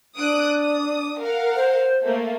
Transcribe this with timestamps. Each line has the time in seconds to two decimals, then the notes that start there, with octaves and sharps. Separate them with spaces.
0.17 D4 D#6 F#6 D7
0.58 D#6
1.20 A#4 F5 F#5
1.56 C5
2.03 A3 A#3